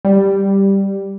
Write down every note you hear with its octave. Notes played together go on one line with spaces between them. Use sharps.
G3